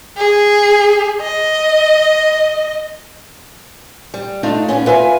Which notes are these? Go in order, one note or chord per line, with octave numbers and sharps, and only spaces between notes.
G#4
D#5
G3
A3 D4 D#4 F4
A#2 B3 C#4
F4 B4 E5 G#5